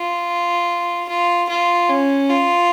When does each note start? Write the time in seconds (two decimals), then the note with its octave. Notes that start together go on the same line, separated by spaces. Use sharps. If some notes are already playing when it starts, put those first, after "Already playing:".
Already playing: F4
1.09 F4
1.49 F4
1.89 C#4
2.30 F4